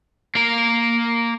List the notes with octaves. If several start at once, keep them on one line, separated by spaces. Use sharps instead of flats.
A#3 A#4